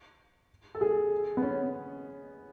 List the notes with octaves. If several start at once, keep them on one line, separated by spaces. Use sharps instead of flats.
A4
G#4
B3
C#4